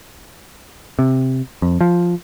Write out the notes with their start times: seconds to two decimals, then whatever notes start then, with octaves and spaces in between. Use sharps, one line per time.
0.99 C3
1.62 F2
1.81 F3